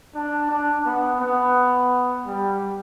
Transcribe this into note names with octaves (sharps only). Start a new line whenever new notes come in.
D4
D4
B3
B3
G3